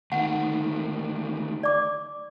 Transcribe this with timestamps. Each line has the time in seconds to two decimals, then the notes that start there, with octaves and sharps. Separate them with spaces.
0.12 D2 D#3 F#5
1.63 D5 D6